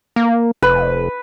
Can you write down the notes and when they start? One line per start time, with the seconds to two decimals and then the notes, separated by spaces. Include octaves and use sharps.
0.16 A#3
0.62 F1 B4